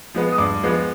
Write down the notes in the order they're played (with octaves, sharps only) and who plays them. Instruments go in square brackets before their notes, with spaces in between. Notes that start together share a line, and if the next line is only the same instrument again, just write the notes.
[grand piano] F3 G#3 B3
D#6
G2 D6
F3 G#3 B3